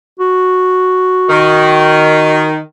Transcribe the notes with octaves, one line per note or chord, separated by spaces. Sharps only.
F#4
D#3